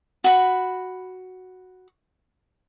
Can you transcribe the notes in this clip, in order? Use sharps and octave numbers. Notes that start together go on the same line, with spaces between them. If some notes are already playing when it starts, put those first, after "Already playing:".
F#4 B5